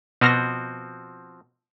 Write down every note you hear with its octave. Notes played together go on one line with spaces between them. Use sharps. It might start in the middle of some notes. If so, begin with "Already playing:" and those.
B2 F3 C4 F#4 F6 A#6